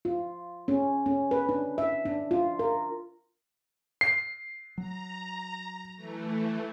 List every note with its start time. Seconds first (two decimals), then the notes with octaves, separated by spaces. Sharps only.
0.05 F4
0.68 C#4
1.06 C#4
1.31 B4
1.49 D4
1.78 E5
2.05 D4
2.31 F4
2.59 A#4
4.01 C7
4.78 F#3 A#5
5.96 E3 A3